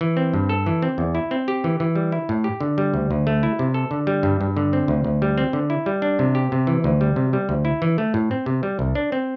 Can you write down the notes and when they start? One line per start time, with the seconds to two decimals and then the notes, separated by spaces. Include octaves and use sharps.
0.01 E3
0.17 C4
0.33 G2
0.49 A4
0.66 E3
0.82 C4
0.98 E2
1.15 E4
1.31 C4
1.48 G4
1.64 E3
1.80 E3
1.95 G3
2.12 E4
2.29 A2
2.44 G4
2.61 D3
2.78 G3
2.94 D2
3.11 D2
3.27 A3
3.43 E4
3.59 C3
3.74 A4
3.91 D3
4.07 G3
4.23 G2
4.41 G2
4.57 D3
4.73 C4
4.88 D2
5.04 D2
5.22 G3
5.38 C4
5.53 D3
5.70 E4
5.86 G3
6.02 D4
6.19 C3
6.35 G4
6.52 C3
6.67 E3
6.84 D2
7.01 G3
7.16 C3
7.33 G3
7.49 D2
7.65 E4
7.82 E3
7.98 A3
8.14 A2
8.31 C4
8.46 C3
8.63 G3
8.79 C2
8.95 D4
9.12 C4